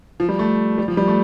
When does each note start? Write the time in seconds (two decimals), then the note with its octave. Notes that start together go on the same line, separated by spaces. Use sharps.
0.20 F3
0.29 G3
0.39 A3
0.78 G3
0.88 F3
0.97 G3
1.08 A3